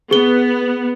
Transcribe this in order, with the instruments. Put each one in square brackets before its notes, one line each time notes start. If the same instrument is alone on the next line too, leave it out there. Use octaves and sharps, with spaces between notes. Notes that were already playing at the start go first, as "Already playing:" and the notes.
[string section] B3 [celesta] G#4 G7